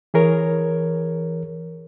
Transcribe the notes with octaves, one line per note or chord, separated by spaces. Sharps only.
E3 G#4 A#4 C#5